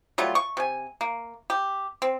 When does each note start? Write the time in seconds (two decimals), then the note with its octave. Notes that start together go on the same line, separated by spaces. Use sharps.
0.18 F#3 G3 A3 F4
0.35 C#6
0.57 C3 G#5
1.01 A#3
1.50 G4
2.02 C4